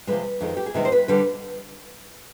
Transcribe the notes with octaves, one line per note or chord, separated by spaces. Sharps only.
C3 F3 G#3 B4
F2 D#3 G#3
G4
G#4
C3 D#3 G#3 B4
C5
B4
D3 G3 B4